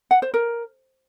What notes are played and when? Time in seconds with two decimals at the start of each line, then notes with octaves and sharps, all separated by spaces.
0.11 F#5
0.22 C5
0.34 A#4